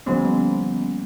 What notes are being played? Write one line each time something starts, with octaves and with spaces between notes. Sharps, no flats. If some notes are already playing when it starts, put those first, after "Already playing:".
D3 F3 G3 A#3 B3 C#4